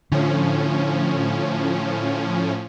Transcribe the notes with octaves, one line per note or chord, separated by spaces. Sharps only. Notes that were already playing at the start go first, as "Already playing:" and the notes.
A2 D3 F3 C#4